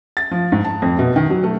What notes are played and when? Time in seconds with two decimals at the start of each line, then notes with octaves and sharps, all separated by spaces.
0.17 A6
0.31 F3
0.52 G#2
0.64 A5
0.82 F2
0.99 B2
1.16 D#3
1.30 F#3
1.44 A3